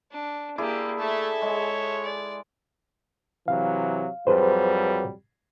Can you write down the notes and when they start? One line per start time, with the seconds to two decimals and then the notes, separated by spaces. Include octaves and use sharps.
0.12 D4
0.58 A#3 E4 G4 G#4 D5
0.99 A3 A4 E5
1.42 G#3 C#5
2.03 D5
3.48 C3 E3 F#3 F5
4.27 F2 F#3 G3 G#4 B4 C5